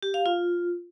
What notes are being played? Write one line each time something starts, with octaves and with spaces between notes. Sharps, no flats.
G4
F5
F4